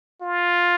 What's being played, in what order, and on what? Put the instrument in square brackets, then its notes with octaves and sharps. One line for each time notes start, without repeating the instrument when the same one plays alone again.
[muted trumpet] F4